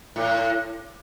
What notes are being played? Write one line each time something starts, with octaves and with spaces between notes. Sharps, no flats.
A2